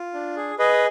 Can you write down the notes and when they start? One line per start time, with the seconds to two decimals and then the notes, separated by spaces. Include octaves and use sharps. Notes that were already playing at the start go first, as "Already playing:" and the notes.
Already playing: F4
0.14 D4
0.36 G#4
0.59 G#4 B4 D#5